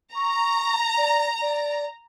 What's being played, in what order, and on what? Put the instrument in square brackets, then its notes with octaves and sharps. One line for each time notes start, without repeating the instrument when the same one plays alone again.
[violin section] A#5 [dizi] C#6
[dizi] D5
D5